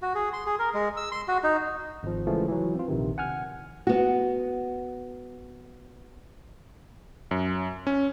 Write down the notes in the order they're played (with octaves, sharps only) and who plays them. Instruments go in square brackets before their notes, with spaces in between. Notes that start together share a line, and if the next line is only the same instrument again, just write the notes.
[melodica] F#4
G#4
C6
G#4
A#4
G#3
E6
C6
F#4
D#4
[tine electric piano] G#1 F3
C#3 E3 F3 G#3 A3
E3 F#3
C4 F4
A#1 C3 D#3
F#5 G#5 F6 G#6
[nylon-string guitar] B3 F#4
[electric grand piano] F#2
C#4